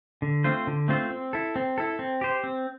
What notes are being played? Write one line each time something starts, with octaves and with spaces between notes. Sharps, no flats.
D3
A3 C4 F4 C5
D3
A3 C4 F4 C5
C4
E4 A4
C4
E4 A4
C4
G4 C5
C4